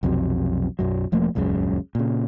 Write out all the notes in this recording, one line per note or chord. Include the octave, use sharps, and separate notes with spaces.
B1 F2 C3 F#3
B1 F#2 F#3
E1 F3 A3 A#3
D#1 C#2 F#2 C#3
A#2 C#3